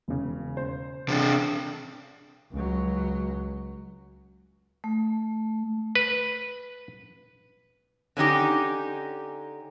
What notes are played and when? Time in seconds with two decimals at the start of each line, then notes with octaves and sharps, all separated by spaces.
0.08 E1 C#3
0.57 C5
1.09 C3 D4
2.52 C#2 F#3
4.84 A3
5.95 B4
8.17 D3 C#4 D#4 G4